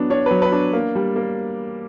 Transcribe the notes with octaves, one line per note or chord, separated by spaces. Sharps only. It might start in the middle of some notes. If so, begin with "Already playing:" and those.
Already playing: F#3 B3 D4
D4 C#5
F#3 B4
B4
D4
A#3
G3
A#3